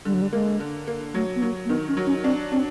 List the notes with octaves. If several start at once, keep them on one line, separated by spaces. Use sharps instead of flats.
D3 G3
F#3
G3
G#3 A#3
D3
A#3
F#3 A3
B3
F#3 A#3
A#3
D#3 B3
C#4
F#3
C#4
C4 D4
C4 D4